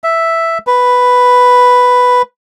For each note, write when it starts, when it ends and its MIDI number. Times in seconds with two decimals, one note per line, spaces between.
0.04 0.58 76
0.67 2.22 71